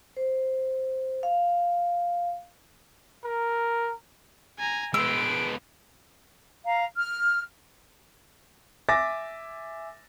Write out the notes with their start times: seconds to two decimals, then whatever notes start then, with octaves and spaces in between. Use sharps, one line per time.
0.17 C5
1.23 F5
3.24 A#4
4.58 G#5 A#5
4.94 G#3 B3 B4 C5 E6 D7
6.65 F5 A#5
6.97 F6
8.89 E5 G#5 D6 A6 A#6